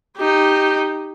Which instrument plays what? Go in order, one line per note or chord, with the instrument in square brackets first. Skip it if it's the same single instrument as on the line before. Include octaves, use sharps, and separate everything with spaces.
[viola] D#4 G4